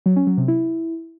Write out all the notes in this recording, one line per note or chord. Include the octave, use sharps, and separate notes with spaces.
F#3
C#4
F#3
C3
E4